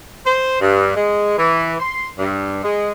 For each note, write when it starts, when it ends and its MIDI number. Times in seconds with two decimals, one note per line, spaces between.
0.26 0.59 72
0.61 0.95 43
0.96 1.37 56
1.38 1.74 52
1.80 2.09 84
2.19 2.60 43
2.63 2.92 56